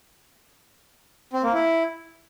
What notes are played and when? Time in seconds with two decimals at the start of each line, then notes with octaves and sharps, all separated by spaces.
1.33 C4
1.43 A#3
1.53 E4